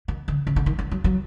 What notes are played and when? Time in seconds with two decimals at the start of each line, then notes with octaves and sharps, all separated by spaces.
0.08 D#3
0.28 D3
0.47 C#3
0.56 D3
0.66 D#3
0.79 E3
0.91 F#3
1.04 F#3